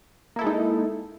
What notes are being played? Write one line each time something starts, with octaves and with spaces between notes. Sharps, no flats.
G#3 A#3 D#4 E4 A4